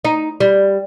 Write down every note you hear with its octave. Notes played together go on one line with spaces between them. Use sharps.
D#4
G3